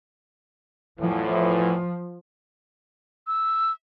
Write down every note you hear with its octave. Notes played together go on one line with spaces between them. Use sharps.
E2 A2 E3 F3
E6